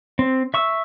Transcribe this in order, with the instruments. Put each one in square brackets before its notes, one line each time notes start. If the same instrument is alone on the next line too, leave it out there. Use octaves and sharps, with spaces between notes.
[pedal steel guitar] C4
E5 C#6 E6